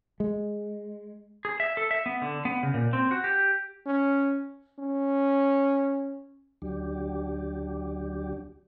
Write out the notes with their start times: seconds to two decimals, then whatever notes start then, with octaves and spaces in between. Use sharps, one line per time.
0.20 G#3
1.45 G#4
1.60 E5
1.77 A4
1.91 E5
2.06 B3
2.22 D3
2.45 B3
2.63 C#3
2.74 A#2
2.93 C4
3.11 F#4
3.24 G4
3.86 C#4
4.79 C#4
6.62 D2 F#3 D4 G4